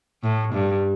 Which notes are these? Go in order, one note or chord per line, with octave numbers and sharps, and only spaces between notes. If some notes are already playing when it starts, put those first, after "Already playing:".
A2
G2